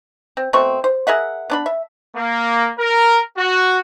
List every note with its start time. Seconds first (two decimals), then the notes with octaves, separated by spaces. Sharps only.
0.37 C4
0.53 B2 A3 C4 C#6
0.84 C5
1.07 G#4 A#4 E5 F#5
1.50 B3 D4 B5
1.66 E5
2.16 A#3
2.79 A#4
3.38 F#4